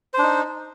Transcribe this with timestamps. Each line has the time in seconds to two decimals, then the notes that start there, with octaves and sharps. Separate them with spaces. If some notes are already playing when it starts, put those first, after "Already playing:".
0.14 C5
0.18 D4
0.23 D#4